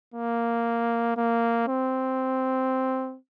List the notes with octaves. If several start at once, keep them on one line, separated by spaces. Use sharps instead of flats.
A#3
A#3
C4